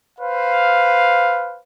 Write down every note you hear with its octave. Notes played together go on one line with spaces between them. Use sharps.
B4 C5 F5